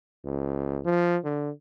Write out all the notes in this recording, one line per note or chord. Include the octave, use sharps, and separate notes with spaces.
C#2
F3
D3